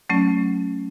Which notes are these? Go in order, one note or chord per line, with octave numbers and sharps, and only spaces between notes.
F#3 A3 C#4